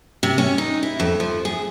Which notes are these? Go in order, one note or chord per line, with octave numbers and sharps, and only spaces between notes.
C3
C#4
D#4
E4
F2
F3
G#4